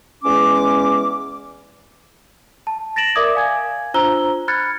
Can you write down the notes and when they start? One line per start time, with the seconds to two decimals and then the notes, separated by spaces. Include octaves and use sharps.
0.23 E2 G#3 C#4 D6
2.67 A5
2.96 A6 A#6 D7 E7 F#7
3.15 A#4 D5 E5 D6 D#6 G#6
3.35 F5 G#5 G#6
3.94 D4 F4 C5 A#5 E6 G7
4.48 B5 F6 F#6 G#6 A6 C#7